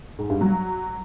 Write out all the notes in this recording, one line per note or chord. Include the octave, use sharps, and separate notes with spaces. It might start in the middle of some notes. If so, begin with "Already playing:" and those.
G#2
G2
F#3